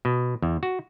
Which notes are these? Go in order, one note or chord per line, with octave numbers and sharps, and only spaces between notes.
B2
E2
F#4